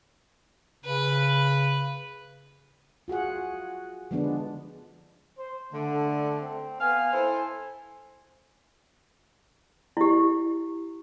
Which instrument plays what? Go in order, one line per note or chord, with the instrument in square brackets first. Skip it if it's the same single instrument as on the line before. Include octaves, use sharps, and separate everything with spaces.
[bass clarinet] C#3 [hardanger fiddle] B4
[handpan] F4 F#4 G#4 F#5
D3 F3 G#3 B3 D4
[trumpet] C5
[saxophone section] D3 [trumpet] A3
[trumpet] C4
[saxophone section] B3 F5 [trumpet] G#5
[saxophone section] E4 A4 C5
[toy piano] E4 G4